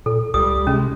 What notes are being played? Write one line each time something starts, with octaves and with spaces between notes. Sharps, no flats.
A#2 A4
C#2 G3 D#6
C3 G#3 C#4